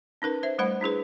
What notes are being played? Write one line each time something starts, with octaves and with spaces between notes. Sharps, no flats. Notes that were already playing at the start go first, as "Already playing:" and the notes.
C#4 D#4 A#4 B4
C5 E5
G3 A3 C5 F#5 B5
D4 E4 G#4 B4